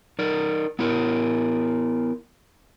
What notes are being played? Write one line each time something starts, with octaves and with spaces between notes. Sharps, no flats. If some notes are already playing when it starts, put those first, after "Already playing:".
D#4 A#4 D5
B3 E4 A#4